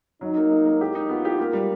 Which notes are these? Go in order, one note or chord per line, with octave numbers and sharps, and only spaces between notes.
F#3 D#4
A#3
A#3
A#3
G4
D#4
B3 F4
G4
A#3
G3